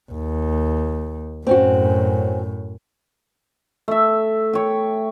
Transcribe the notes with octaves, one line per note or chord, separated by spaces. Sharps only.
D#2
F#2 A2 C4 C#4 F#4
A3 E5
C#5 G5